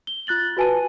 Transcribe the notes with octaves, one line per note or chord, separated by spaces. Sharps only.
G7
F4 F#6 A6 F#7
F#4 B4 G#5 A5 D#7